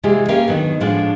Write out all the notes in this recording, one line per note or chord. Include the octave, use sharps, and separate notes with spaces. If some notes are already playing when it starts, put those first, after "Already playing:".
C3 E3 G#3 F4 G4 G#4
A#3 C#4 G4 A#4 F5 G5
D2 A2 D#3 F#3 B3
A2 F3 G#3 D4 F4 F#4